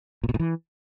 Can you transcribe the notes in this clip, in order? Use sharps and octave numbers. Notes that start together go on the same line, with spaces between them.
A#2
B2
A2
E3